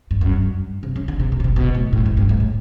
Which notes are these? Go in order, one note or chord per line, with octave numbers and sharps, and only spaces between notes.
G2
F#2
G2
C3
C#3
D3
C3
B2
C#3
C3
B2
A2
A2
G#2
G2
G#2
A2